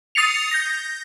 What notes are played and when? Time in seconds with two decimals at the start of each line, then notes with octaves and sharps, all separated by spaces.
0.15 D#6 A6 C7 C#7 F7
0.51 G6 A#6